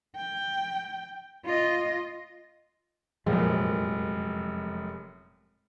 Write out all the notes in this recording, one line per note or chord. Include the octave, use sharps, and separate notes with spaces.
G5
F4 D#5
F1 F#2 A#2 F3 G#3